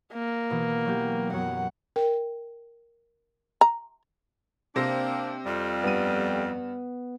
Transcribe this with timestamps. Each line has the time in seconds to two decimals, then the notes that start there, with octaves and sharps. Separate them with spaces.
0.13 A#3
0.50 B2 E3 B3
0.85 F#3 B3 G4
1.33 F#2 F#3 B3 F#5
1.96 A#4 G5
3.61 A#5
4.76 C3 A#3 C4 D4 C5 A#6
5.45 F2 G3
5.84 G2 B3 D#7